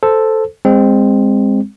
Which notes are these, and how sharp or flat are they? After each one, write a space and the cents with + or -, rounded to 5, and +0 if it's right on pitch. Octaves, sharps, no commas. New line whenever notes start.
A4 +0 C5 -5
G#3 -25 C4 +0